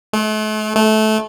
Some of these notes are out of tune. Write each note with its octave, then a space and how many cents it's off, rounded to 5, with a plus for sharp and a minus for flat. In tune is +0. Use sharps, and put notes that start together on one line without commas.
A3 -40
A3 -20